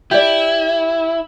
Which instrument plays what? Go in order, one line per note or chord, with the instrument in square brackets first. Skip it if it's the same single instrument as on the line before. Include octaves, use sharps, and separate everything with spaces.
[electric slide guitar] E4 [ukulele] G4 D5